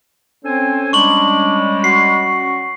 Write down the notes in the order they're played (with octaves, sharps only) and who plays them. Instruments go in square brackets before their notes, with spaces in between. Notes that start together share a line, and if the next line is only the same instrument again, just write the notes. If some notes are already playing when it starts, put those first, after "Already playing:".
[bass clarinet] C4 [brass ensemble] C#4 [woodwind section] A4 C5 G#5
[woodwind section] G3 G#3 [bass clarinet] D4 [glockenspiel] C#6 F#7
[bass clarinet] F#4 [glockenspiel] C7